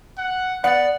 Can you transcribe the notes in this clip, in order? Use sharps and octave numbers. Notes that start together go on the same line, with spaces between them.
F#5
B3 D5 F#5